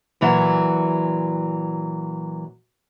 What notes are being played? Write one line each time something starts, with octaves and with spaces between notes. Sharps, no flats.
A#2 E3 F#3